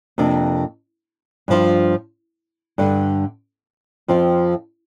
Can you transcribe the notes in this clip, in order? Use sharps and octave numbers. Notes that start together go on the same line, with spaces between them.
F2 C3 A#3 D4
G2 F3 D4 F4
G2 D3 G3
F2 F3 C4 F4